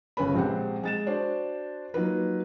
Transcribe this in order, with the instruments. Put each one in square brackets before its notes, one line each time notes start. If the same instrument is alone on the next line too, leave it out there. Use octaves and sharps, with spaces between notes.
[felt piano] G1 C#3 C#4 B4 B5
A#1 G#3 C4 G4 F#5
G#3 A6 E7
D4 F#4 C5 D5
F#3 A#3 D#4 F4 B4